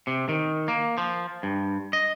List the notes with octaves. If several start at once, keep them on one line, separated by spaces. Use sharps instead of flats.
C3
D#3
A#3
F3
G2
D#5